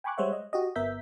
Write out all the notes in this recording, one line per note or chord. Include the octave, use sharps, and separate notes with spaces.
G5 G#5 B5 C#6 D6 F#6
G3 G#3 C5 C#5 E5 F#5
D#5
F#4 G4 D#5
G1 B3 A#4 E5 G6 B6